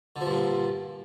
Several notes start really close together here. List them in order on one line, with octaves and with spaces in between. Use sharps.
D3 F3 G2 A#2